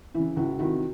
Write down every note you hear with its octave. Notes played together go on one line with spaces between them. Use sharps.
C#3 E3 E4
C#2 E4 F#4
C3 D#3 E4 F#4